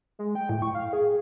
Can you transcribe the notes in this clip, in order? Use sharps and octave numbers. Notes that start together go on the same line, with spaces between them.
G#3
G5
A2
C#6
F5
G#4